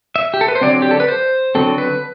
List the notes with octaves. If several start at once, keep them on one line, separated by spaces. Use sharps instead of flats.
E5
G4
A4
B4
C5
D3 F#3 C4 D5
G4
A4
B4
C5
D3 F#3 C4 A4
B4